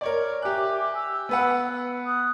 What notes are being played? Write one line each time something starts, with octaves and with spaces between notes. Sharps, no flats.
A#4 C#5 D5
G4 E5 G#5 D6 F#6
E6
B3 B4 F#5
D#6 F#6